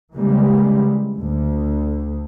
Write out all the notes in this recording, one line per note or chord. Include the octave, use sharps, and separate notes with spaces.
C#3 E3 G3 G#3 A#3
D2 D3